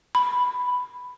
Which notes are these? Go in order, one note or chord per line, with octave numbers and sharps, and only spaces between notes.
B5